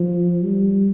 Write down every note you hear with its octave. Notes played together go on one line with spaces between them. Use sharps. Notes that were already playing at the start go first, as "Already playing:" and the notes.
Already playing: F3
G3